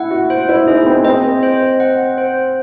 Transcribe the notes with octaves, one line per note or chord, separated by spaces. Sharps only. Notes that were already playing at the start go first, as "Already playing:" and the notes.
Already playing: E4 F#5
F#4
C5
E4
D#4 G#4
C4
C4 D#5
C5
F#5
C5